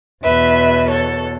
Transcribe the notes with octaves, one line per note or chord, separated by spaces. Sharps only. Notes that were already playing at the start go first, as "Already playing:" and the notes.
E2 B2 B4 E5
A4 C#5